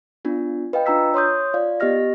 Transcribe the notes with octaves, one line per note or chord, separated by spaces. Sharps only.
B3 D4 F4
B4 D#5 F5 G5
D4 F4 A#5 E6 B6
C#5 C6 D#6 G6
F4 D5 F5
B3 G4 D#5 F6 A#6